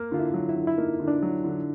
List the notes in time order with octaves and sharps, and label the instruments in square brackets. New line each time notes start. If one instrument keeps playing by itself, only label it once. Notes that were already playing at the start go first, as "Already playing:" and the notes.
Already playing: [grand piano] A#3
[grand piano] D3 [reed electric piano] F4
[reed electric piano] E4
[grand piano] F#3
[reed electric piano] E4
[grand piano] D3
[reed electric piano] E4
[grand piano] A#3 [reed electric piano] D#4
[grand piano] D3
[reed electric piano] D4
[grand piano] F#3
D3